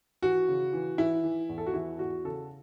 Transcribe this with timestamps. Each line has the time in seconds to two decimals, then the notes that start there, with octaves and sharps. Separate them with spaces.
0.22 E3 F#4
0.48 C#3
0.73 E3
0.98 E3 E4
1.24 E3
1.49 E2
1.58 A4
1.66 F#4
1.74 E3 E4
1.99 E2 F#4
2.24 C#3 A4